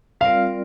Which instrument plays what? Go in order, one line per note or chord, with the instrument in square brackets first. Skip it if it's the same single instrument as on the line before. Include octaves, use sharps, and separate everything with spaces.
[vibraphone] G3 C4 F4 A#4 D5 [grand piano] F5